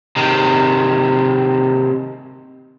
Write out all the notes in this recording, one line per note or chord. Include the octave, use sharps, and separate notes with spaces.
C3 D#3